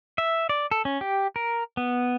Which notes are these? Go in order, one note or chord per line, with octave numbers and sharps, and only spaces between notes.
E5
D5
A4
C#4
G4
A#4
B3